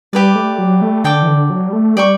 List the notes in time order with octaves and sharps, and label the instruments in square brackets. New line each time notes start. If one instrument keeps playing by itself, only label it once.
[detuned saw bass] G3 [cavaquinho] G4 B4 D5
[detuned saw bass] A3
F#3
A3
[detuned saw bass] D3 [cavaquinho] A4 D5 G5 D6
[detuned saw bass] E3
D3
F#3
G3
A3
[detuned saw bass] G3 [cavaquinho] D5 G5 C#6